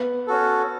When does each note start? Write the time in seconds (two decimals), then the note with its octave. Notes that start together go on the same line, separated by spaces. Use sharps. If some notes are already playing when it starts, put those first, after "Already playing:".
Already playing: B3
0.27 C#4 F#4 A4